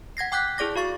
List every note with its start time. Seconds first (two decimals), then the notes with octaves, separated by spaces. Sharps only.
0.17 F#5 G#6 A#6 C7
0.32 G5 D6 F#6 G6 B6
0.58 E4 G#4 D5 D6 A#6
0.76 F#4 F5 C#6 A6